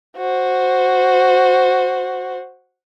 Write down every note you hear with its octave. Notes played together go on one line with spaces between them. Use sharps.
F#4 C5